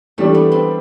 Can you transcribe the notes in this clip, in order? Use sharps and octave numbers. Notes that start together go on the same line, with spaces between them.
E3 G3 A3 D4
B3
C4